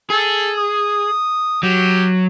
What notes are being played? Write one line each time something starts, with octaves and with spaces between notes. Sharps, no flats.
G#4 A4
D#6
F#3 G4